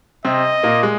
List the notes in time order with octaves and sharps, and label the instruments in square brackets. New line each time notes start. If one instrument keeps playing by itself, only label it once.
[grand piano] C3 C4 [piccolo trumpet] D#5
[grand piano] A#2 A#3
G#3